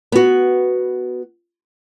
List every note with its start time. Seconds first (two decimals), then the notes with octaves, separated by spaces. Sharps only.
0.12 B3 F#4